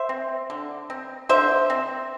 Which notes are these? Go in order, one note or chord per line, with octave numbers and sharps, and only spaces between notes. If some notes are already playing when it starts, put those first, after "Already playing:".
Already playing: C5 E5
C4
D3
C4
D3 C5 E5
C4